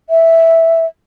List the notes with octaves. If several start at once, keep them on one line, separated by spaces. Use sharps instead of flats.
E5